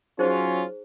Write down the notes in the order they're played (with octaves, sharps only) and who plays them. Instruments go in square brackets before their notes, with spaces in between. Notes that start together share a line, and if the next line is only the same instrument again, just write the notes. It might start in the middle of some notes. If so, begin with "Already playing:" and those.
[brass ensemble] F#3 C#4 F4 [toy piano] D#4 G#4 C5